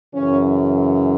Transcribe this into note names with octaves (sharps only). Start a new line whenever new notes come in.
F#2 C#3 E3 C#4